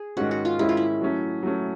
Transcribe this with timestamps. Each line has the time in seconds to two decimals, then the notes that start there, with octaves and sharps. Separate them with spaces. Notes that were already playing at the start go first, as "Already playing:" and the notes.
Already playing: G#4
0.17 G#2 D#3 G#3 C#4 F#4
0.31 F#4
0.45 F4
0.59 G#2 D#3 G#3 C#4 E4
0.69 F4
0.77 E4
1.01 F#3 A3 C#4
1.43 F#3 A3 C#4